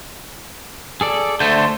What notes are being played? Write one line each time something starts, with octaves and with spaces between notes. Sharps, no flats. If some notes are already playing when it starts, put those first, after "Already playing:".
G#4 A4 D5
D3 A3 C5 G6